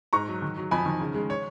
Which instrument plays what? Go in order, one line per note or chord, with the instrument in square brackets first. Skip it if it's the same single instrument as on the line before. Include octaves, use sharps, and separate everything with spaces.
[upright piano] G#2 A#5 C#6
F#3
D#3
F#3
F2 G#5 B5
D#3
C#3
G#3
C#5